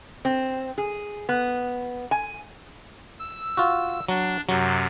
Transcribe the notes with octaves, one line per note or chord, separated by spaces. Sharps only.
C4
G#4
B3
G#5
E6
F4 F#4
F#3 D4
F#2 C3 F#3